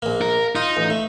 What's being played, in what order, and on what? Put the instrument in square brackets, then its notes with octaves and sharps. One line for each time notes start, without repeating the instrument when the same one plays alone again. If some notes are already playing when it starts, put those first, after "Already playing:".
[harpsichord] A#1 A#3
[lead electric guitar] A#4
[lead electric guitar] D#4 [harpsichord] F4
[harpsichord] A1
A3